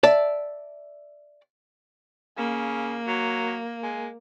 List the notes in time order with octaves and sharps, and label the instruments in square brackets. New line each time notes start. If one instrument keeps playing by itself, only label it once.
[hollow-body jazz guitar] D5 E5 A5
[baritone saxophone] C#3 [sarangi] A#3
[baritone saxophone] F#3
G#3